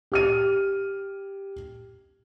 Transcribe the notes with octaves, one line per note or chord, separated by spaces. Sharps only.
G4 F6 D#7